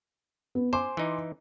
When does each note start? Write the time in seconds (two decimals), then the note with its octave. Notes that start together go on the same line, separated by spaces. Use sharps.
0.55 B3
0.73 C5 G#5 C6 D6
0.97 E3 D#4